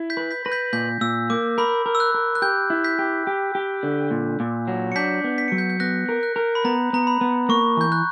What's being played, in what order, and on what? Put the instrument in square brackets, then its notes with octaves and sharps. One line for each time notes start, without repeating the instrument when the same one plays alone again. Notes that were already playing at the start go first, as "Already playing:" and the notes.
Already playing: [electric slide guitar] E4
[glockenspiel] G6 B6
[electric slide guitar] B4
[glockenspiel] G6 B6
[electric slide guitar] B4 [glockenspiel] A#6
[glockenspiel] G6 B6
[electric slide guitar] A#2 [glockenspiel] G6 B6
[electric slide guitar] A#2 [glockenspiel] E6
[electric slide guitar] A#3 [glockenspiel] D6
[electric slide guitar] A#4 [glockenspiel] B5
[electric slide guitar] A#4
[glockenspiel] E6
F#6
[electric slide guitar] A#4
[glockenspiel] F#6
[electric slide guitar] G4 [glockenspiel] G6
[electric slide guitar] E4
[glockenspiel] G6 B6
[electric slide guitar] G4
G4
G4
D3
A#2
A#2
F#3
[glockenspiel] C#7
[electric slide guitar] D4 [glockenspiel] G6 B6
[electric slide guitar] B3
[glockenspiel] B6
[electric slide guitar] F#3 [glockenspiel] C#7
[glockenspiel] G6 B6
G6
[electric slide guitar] B3 [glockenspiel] F#6 A#6
[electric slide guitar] A#4
[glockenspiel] F#6
[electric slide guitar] A#4
[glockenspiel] B5
[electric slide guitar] B3 [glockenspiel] A#5
[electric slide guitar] B3 [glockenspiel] A#5
[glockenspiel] B5
[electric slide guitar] B3
[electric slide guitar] A#3 [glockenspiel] C#6
[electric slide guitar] E3 [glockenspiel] G6
[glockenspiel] F#6